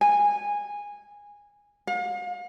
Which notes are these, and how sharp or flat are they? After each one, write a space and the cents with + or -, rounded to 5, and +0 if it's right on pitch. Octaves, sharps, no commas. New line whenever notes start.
G#5 -15
F5 +45